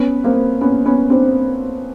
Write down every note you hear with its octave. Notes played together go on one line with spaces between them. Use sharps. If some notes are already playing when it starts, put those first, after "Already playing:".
Already playing: B3 C#4
A#3 C4
B3 C#4
B3 C#4
C4 D4